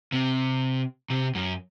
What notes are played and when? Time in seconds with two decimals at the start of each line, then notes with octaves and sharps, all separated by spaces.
0.12 C3
1.10 C3
1.35 F#2